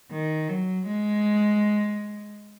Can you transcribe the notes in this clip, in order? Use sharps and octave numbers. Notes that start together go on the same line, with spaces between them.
D#3
F#3
G#3